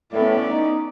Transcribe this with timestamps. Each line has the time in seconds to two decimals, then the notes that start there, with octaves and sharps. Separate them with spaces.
0.13 A2 B3 C#4 D5
0.49 D#4